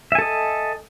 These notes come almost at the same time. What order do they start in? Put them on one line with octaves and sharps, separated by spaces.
E5 G#5 A4 D#5